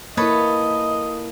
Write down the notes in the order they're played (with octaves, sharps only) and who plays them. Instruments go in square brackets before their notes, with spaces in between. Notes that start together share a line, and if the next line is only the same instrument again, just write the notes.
[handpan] A#3 E4 [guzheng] A4 B4 C#5 [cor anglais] D#5